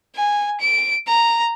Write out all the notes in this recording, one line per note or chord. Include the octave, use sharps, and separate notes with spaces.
G#5
D7
A#5